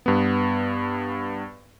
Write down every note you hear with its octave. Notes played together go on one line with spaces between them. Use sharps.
G2 B3